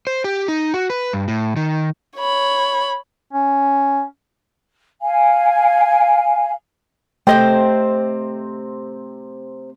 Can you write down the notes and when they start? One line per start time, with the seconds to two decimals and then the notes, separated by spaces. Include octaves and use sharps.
0.07 C5
0.24 G4
0.48 D#4
0.74 F#4
0.90 B4
1.13 G2
1.28 A2
1.56 D#3
2.19 C#5 B5
3.33 C#4
5.01 F5 G#5
7.27 C3 A3 C4 C5 D#5 G5